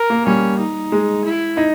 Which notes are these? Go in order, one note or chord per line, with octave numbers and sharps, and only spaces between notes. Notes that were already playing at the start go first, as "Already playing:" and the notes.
Already playing: A#4
A#3
G3 C#4
D#4
G#3
E4
D#4